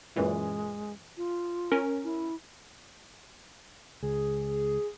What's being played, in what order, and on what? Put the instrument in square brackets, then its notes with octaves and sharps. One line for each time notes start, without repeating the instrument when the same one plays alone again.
[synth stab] F#2 A#2 E3 [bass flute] G#3
[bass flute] F4
[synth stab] C#4 A#4
[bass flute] E4
[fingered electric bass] C#2 [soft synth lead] G#4